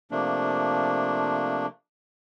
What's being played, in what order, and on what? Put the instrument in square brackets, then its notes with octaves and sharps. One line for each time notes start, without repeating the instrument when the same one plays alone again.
[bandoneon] C3 F3 A3 A#3 D4